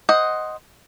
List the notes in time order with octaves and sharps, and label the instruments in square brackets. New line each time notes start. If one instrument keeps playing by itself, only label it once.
[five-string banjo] C5 D#5 F#5